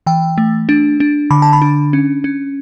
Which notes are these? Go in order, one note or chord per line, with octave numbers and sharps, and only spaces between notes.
E3 G5
A3
D4
D4
D3 B5
A5
B5
D4
C#4
C#4